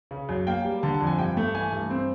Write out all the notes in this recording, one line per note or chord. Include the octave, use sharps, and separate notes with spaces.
C#3
F#2
A#3 G5
G3
D3 A5
A5
F2
G#5
G2 G5
A3
E3 G#5
G2
C4